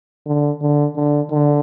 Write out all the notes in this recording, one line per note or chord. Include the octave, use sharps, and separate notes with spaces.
D3
D3
D3
D3